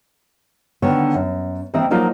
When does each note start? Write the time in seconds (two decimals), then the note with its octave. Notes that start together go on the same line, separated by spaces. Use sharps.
0.82 D3 D#3 B3 C#5
1.14 F#2
1.74 D#3 E3 A#3 C4 E4 D#5
1.90 F3 F#3 A#3 D#4 F4